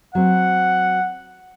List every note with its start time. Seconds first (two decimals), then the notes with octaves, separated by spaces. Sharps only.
0.15 F#3 C4 F#5